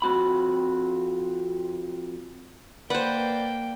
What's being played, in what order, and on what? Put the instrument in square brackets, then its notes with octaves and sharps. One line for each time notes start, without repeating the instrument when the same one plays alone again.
[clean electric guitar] F2 C4 F#4 B5
[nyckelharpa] A#3 G5 [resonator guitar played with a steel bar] B4 [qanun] C5 F#5 [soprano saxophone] D5